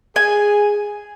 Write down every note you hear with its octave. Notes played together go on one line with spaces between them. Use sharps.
G#4 G#5